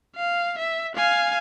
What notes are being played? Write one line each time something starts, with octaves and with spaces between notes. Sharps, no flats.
F5
E5
F5 G#5